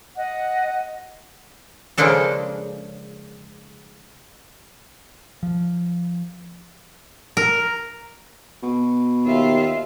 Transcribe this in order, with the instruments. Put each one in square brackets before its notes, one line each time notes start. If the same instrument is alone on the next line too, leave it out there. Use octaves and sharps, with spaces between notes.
[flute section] D#5 F#5
[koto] C#3 F3 G#3 A#3 D4 A4
[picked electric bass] F3
[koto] A#4
[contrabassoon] B2
[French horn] D#2 [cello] F4 E5